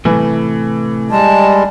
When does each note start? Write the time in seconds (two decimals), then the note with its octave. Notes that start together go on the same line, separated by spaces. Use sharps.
0.05 A2 C3 E3 A3
1.10 G3 G#3 A5